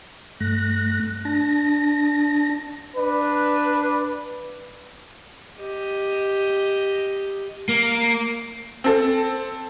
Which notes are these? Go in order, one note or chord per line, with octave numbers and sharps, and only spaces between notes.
G2 A3 F#6 A#6
D4 A5 A#6
D4 B4
G4 D#5
A#3
C4 A4